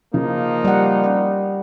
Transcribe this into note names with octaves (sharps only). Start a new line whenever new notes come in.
C#3 F3 A#3 D#4
G3 F#5